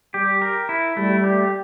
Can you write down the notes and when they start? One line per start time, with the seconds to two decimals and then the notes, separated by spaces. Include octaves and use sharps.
0.14 G3 G4
0.42 A#4
0.69 E4
0.97 G3 A3
1.24 G4